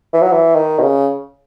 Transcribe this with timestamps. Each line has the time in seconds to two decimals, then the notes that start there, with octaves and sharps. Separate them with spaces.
0.13 E3
0.22 F#3
0.32 E3
0.55 D#3
0.79 B2
0.83 C#3